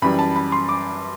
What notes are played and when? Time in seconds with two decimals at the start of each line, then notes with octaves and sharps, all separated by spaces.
0.02 F#2 E3 G3 B5
0.19 A5
0.36 B5
0.52 C6
0.69 D6